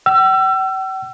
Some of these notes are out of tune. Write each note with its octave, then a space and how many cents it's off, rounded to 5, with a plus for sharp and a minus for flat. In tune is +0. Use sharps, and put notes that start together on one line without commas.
G5 -45 E6 +30